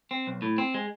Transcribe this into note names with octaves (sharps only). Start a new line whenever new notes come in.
C4
B1
A2
C4
G#3